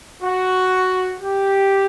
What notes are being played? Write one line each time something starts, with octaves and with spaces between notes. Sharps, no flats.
F#4
G4